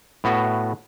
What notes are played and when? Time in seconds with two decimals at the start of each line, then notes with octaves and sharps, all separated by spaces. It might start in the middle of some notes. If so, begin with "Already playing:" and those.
0.24 A2 B3 F#4